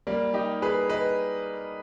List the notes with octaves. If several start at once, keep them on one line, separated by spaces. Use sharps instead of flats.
G3 A#3
D#4 G4
G#4 B4
B4 D#5